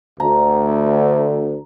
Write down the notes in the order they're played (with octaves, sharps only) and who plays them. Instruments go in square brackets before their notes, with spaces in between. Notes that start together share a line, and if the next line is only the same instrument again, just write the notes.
[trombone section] D2 [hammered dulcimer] A#5